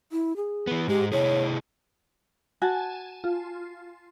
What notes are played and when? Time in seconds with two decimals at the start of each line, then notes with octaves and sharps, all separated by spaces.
0.12 E4
0.36 G#4
0.67 E3 B3
0.88 G#2 G#3 G4
1.12 C3 E4 G#4 C#5
2.62 F#4 G#5 A5
3.24 F4